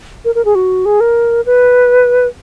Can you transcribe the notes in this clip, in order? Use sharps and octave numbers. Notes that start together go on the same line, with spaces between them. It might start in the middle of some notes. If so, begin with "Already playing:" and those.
A#4
A#4
G#4
F#4
G#4
A#4
B4